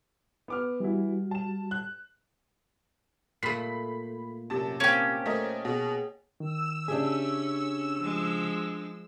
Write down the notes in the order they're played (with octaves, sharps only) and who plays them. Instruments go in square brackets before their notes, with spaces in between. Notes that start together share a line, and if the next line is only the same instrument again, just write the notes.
[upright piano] B3 D6 F6
[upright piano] E3 E4 [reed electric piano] G3 F#4
[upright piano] A5 E7
F#6
[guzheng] A#2 A3 [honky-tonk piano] B5 B6 C7
[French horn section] F#2 [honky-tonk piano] C3 A5
[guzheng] A#3 [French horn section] C4 [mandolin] C#4 G4
[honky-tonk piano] A3 A#4 D#5 [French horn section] C5 C#5
[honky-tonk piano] B2 [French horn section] G#4
[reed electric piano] D#3 [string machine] E6
[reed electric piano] C#3 G#4 [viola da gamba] C#4 [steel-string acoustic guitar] D4 G4 E5
[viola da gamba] F3 G#3